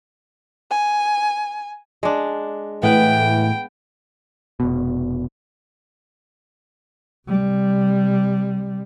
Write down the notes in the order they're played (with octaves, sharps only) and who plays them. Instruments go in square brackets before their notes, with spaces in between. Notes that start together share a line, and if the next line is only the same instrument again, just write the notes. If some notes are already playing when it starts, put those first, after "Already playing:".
[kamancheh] G#5
[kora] G#3 D4
[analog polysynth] A2 D7 [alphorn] E3 [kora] B3 B4 [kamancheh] G5
[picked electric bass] F1 B2
[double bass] C3 G3